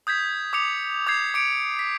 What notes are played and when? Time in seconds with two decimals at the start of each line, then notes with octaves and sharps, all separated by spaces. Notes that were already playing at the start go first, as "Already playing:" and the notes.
0.07 D#6 G6 G#6 B6
0.53 D6 D#6 C#7 F7
1.07 D6 G6 G#6 C7
1.34 D6 C#7 D7
1.79 B6